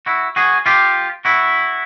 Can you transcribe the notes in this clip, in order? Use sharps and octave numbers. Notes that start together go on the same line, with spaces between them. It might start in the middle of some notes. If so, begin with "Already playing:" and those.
E4 F#4
F#4 G#4
F4 G4
E4 F#4